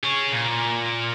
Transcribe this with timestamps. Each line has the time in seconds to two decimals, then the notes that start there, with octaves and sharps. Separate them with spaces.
0.04 G#4 C#5
0.32 A#2